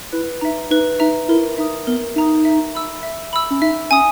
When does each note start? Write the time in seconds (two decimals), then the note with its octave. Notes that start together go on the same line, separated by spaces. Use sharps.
0.13 E4 B4
0.41 D#4 E5 A#5
0.71 D#4 B4
1.00 D#4 E5 A#5
1.28 E4 A#4
1.58 D#4 E5 A#5 D#6
1.87 B3 A#4
2.16 D#4 E5 A#5 D#6
2.45 E5
2.75 B5 E6
3.03 E5
3.33 B5 E6
3.50 C#4
3.62 D#4 E5
3.91 C#4 G#5 D#6